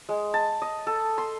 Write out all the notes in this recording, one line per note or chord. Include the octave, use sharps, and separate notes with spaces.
G#3
A5
D#5
A4
C6